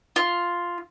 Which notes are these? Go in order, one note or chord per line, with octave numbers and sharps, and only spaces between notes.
F4